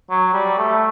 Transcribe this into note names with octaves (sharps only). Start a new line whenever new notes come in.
F#3
G3
A3